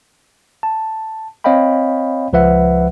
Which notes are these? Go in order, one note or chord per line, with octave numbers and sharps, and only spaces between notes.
A5
C4 C#5 D#5 F5 G5 B5
C#2 F3 B4 E5 F#5